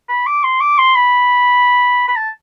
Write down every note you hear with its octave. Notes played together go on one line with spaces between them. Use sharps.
B5
D6
C6
D6
C6
B5
B5
A5